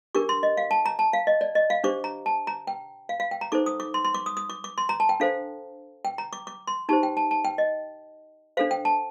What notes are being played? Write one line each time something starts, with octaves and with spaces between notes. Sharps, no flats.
D4 G4 A#4 D6
C6
D#5
F5
A5
A#5
A5
F5
D#5
D5
D#5
F5
D4 G4 C5 D6
A#5
A5
A#5
G5
F5
F5
G5
A#5
D#4 A4 C5 D6
D#6
D6
C6
C6
D6
D#6
D#6
D6
D6
C6
A#5
A5
G5
D4 A4 C5 F5
G5
A#5
D6
D6
C6
D#4 G4 C5 A5
G5
A5
A5
G5
D#5
D4 A4 C5 F5
G5
A5